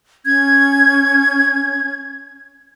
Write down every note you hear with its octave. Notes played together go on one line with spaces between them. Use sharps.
C#4 G#6